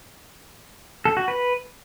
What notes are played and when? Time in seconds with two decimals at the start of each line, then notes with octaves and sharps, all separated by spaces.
1.05 A4
1.17 F#4
1.28 B4